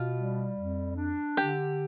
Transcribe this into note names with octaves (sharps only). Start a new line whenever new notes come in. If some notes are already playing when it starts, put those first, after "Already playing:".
Already playing: B2 F4
G3
F2
D4
D3 G4